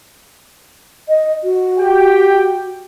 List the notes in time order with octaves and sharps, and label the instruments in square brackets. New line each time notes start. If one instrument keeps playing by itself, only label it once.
[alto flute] D#5
F#4
[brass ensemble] G4 G5